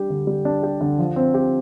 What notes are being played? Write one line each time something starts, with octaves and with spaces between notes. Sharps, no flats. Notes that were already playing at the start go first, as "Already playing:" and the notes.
Already playing: G3 D4 G4
D3
G3
D4
G4
D3
F3
C4
G4